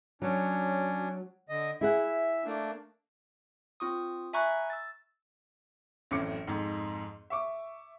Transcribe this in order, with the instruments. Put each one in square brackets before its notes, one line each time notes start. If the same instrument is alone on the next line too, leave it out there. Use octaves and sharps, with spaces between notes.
[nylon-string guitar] F#3 [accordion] C#4 D4
[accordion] D3 D#5
[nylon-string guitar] E4 G#4 F#5 [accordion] E5
[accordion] A3 A#3 D4
[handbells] C4 F4 C#6 D#6
E5 G#5 A#5 B5 C#6 F#6
E6 A6
[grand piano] A1 F#2 A2 C4 D6 C#7
F2 G#2
E5 C#6 D6